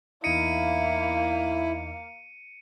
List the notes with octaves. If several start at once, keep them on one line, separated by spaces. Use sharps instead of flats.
E2 A#3 D#4 E4 D#5 F5 C#7 D#7